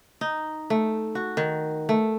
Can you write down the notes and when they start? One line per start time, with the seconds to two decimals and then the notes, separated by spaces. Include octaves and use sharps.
0.21 D#4
0.70 A3
1.15 F#4
1.37 D#3
1.89 A3